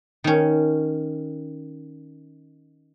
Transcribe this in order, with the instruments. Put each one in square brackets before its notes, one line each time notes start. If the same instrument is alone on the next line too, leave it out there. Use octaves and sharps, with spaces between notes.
[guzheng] D#3 C#4